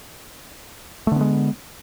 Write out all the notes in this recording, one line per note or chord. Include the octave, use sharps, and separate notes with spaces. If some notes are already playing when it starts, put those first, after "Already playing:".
D3 G#3 A3 B3